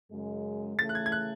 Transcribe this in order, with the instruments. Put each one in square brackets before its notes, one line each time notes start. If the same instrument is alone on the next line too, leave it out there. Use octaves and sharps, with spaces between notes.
[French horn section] F#2 C#3 G#3
[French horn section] C#3 E3 A3 [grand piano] A6
[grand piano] F#6
G#6
G#6
F#6